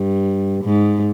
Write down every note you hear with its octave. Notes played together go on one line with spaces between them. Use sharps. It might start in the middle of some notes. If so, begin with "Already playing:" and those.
Already playing: G2
G#2